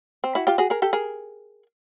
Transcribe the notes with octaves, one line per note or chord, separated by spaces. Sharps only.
C4
E4 F#4
F4 G4
F#4 G#4
G#4 A#4
G4 A4
G#4 A#4